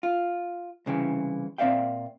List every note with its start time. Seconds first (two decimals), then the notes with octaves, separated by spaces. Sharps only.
0.03 F4
0.86 C2 C#3 E3 G5
1.58 A#2 C4 D5 E5 F5 G5